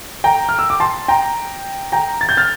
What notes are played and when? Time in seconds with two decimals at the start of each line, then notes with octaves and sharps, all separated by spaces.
0.24 G5 A#5
0.49 F6
0.59 E6
0.70 D6
0.80 A5 C6
1.08 G5 A#5
1.92 G5 A#5
2.21 A6
2.29 G6
2.37 F6 A6